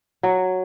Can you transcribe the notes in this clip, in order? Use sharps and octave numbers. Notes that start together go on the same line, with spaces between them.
F#3